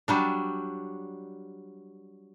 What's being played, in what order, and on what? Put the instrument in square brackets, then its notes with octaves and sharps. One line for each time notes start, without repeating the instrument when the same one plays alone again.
[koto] F#3 G3 D4